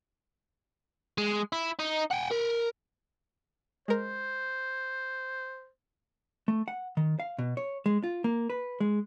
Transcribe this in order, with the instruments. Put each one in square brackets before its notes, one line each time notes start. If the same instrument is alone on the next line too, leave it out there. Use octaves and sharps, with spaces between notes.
[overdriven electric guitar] G#3
E4
D#4
F#5 G5
A#4
[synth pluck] G#3 A#4 [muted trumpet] C5
[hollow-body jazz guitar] A3
F#5
D#3
F5
B2
C#5
G#3
F4
A#3
B4
G#3